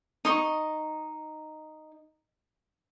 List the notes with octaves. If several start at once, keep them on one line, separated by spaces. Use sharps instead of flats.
D#4 D#5 C#6